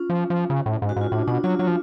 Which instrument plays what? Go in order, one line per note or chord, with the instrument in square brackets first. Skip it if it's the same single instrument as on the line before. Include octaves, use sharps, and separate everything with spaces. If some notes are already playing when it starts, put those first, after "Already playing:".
Already playing: [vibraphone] C#4 F4
[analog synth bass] F3
F3
C#3
A2
G#2
[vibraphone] F#4
[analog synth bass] G#2 [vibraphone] F4
[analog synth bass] A2 [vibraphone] D4
[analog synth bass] B2 [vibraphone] D4
[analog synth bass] F#3 [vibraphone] F4
[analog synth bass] F#3 [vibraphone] F4
[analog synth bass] F3